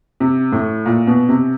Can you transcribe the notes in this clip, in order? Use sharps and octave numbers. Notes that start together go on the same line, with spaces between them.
C3
A2
A#2
B2
C3